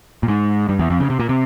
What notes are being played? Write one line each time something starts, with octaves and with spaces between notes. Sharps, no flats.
A#2
G#2
G2
E2
F2
C#3
C3
A#2
C3